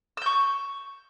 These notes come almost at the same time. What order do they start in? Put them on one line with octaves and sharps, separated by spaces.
E6 G6 C#6